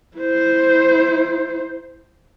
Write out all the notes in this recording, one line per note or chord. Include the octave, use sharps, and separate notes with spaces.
E4 C5